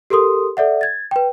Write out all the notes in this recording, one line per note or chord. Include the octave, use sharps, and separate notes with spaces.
G4 A4 A#4 C6 D#6
A4 D5 E5 F#5
G#6 A6
B4 G5